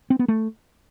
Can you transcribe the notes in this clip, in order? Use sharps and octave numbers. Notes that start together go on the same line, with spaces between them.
C4
B3
A3